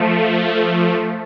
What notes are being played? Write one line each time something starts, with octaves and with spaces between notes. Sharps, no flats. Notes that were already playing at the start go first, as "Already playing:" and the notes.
Already playing: F3 A3